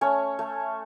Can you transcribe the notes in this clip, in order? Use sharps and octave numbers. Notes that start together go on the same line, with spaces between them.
A3 C#4 C#5
A3